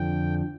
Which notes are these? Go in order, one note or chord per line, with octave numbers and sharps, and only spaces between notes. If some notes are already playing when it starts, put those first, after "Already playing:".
Already playing: F2 D3 F3 G5